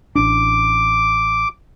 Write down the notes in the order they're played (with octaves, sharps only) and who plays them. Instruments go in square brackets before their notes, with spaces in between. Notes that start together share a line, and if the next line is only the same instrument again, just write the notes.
[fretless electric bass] A1 D4 [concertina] D6